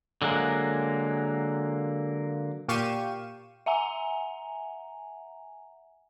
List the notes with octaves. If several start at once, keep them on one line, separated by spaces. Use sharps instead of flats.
D3 F#3 G#3 A#3
A#2 G4 F5 C#6 D#7 E7
E5 F#5 G#5 A#5